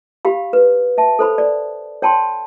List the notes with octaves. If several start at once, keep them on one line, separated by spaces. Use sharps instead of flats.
G4 F5 B5
B4
E5 A5
A4 C5 B5
D5
C#5 G5 A5 B5 C6